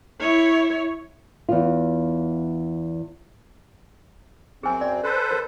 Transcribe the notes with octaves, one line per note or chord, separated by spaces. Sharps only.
E4 C#5
E2 F4
F#2 C4 G#4 G#5
D5
A4 B4 C5
A#4